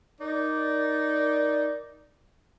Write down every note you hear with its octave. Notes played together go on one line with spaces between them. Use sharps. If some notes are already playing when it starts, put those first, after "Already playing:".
D#4 A#4 D5